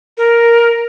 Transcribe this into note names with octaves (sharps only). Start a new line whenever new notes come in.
A#4